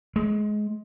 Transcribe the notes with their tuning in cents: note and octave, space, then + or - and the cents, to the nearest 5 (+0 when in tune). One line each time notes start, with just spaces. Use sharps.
G#3 +20